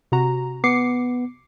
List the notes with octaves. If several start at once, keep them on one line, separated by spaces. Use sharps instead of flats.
C3 F#4 A#5
B3 D6 C7 C#7